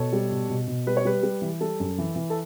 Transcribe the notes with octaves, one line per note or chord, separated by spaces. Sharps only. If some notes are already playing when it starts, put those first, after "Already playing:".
Already playing: B2 A4 C#5
G3
B2
B2
B2
G3 B4
C#5
G3 B4
G3
E3
G3 A4
F#2
E3
E3
A4